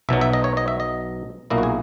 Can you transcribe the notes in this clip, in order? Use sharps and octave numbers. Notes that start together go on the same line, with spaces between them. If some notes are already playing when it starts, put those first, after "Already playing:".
B1 B2 F#3 E5
E5
D#5
C#5
D#5
E5
D#5
B1 A#2 A#3 E4 D#5
F#4
G#4